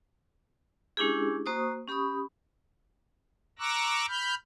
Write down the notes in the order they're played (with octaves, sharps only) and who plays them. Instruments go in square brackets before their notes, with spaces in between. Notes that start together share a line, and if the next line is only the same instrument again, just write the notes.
[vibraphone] G#3 C#4 D4 E4 G4 G#4
A#3 F#4 C5 C#6 D#6
C#4 G4 B5 C#6 D#6
[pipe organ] A#5 C#6 D6 E6 F#6 A#6
B5 F6 G6